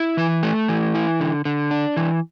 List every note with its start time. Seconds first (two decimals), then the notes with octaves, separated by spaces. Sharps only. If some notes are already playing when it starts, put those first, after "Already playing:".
Already playing: E4
0.17 E3
0.43 A3
0.68 E3
0.94 E4
1.20 D3
1.45 D3
1.71 D4
1.97 E3